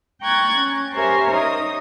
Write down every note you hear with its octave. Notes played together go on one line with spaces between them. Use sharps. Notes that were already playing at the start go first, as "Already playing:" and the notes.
G5 A#5 C#6 F#6 G#6 A6
C#4
G4 A#4 C5 C#5 E5 G#5
D#4 D#6